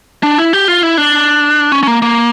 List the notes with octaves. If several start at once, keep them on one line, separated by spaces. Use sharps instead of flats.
D4
E4
G4
F4
E4
D4
C#4
C#4
A#3
A#3